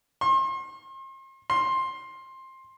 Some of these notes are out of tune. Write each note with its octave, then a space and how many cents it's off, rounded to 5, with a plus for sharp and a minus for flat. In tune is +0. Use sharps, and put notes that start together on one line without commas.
C6 +40
C6 +15